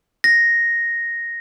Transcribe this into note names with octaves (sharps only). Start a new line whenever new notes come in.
A#6